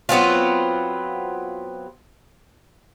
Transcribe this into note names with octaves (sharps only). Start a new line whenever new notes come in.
F#3 B3 C4 F4